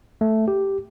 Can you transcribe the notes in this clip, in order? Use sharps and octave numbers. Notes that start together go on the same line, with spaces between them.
A3
G4